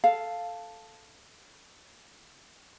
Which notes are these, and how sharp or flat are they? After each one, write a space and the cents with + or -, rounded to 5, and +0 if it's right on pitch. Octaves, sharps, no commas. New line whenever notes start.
A4 +0 F5 +0